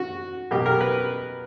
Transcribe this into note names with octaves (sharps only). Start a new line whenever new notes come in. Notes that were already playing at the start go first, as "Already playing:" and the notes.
Already playing: F#4
B2 F#3 A#3 G4
A#4
B4